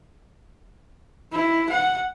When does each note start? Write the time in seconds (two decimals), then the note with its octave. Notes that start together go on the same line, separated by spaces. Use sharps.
1.32 E4
1.70 F#5